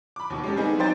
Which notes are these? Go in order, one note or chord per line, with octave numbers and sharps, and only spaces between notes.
B5 D6
D#2 B2
G#3 C#4 G4 A4
G3 B3 C4 D#4 G#4
F#3 D#4 C5 G5 A6